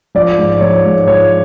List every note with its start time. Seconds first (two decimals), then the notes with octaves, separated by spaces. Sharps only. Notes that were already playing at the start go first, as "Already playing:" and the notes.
0.15 F3 D5
0.38 G#2
0.61 F3 C#5
0.85 G#2
1.07 F3 C#5